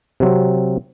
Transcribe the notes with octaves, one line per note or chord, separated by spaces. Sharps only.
C3 F#3 C4